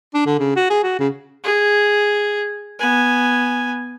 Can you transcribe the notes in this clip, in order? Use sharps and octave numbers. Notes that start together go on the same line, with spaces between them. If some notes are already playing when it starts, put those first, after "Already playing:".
D4
D3
C#3
F#4
G#4
F#4
C#3
G#4
B3 G#5